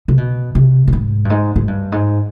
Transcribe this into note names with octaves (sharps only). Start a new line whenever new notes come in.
C3
B2
C3
B2
G#2
G2
G#2
G#2
G2
G#2